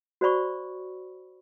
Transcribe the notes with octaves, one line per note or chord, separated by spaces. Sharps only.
F#4 C5 D5 B5 C#6